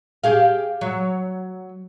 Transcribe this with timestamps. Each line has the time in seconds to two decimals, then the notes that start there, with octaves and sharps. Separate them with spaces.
0.24 G4 G#4 F5
0.81 F#3